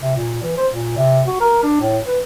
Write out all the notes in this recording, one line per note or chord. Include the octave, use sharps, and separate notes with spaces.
C3
A#2
E3
C5
A#2
C3
F#4
A#4
D4
A2
B4